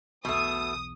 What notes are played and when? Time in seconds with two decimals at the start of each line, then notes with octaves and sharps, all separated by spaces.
0.25 B1 E2 B2 A3 D#6